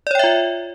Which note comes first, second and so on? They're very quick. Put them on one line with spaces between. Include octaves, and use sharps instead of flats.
D5 C#5 G5 E5 F4